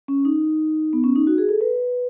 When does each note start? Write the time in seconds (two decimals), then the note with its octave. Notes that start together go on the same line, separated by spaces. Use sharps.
0.08 C#4
0.25 D#4
0.93 B3
1.04 C#4
1.16 D#4
1.27 F#4
1.38 G#4
1.49 A4
1.61 B4